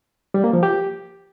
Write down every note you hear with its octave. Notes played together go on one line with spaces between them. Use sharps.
G3
A#3
F3
G4